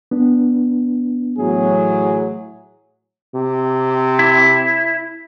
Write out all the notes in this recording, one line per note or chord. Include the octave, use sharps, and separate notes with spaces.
B3 D4
A2 E3 F#3 G#4
C3
E4